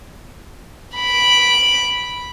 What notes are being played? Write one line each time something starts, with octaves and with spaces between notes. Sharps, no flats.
B5 D7